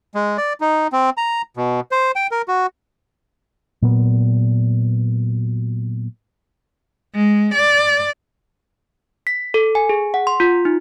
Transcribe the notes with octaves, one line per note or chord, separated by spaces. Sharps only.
G#3
D5
D#4
C4
A#5
B2
C5
G5
A#4
F#4
A#2 F#3 B3
G#3
D5
B6
A4
G#5
G#4
F#5
C6
F4
D#4